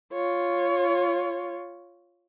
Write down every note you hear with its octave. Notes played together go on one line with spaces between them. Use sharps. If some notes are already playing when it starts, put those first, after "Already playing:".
F4 C#5